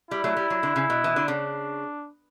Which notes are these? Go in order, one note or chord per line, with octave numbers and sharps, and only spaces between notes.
G3 E4
F#3 A3
G3
F#3
D3
C#3
B2
E3
D3
C#3 D4